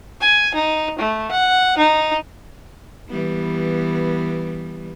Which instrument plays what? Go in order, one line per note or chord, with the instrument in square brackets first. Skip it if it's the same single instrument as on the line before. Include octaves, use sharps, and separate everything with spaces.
[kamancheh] G#5
D#4
A3
F#5
D#4
[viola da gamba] E3 G3 B3